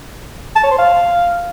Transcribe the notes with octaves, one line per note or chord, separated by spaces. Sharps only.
A5
C#5
C5
F5